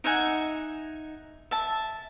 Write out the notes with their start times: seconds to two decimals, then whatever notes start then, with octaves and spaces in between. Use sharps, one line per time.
0.04 D#4 E5 F#5 G#5
1.51 E5 A5